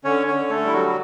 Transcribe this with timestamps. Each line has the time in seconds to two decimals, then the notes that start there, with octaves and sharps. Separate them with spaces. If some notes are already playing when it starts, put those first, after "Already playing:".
0.04 D3 C#4 C#5
0.27 C#4 C#5
0.34 D3
0.50 A3 A4
0.65 G3 E4
0.73 F#3 F#4